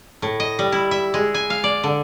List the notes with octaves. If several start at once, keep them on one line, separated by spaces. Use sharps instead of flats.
A2
D#5
G3
E4
E5
G#3
G#5
F5
D5
D3